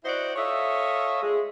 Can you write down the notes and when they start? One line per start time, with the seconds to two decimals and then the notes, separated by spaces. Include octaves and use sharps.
0.04 E4 F#4 C5 D5 D#5 F#5
0.36 F4 A4 C#5 D#5 E5
1.22 G#3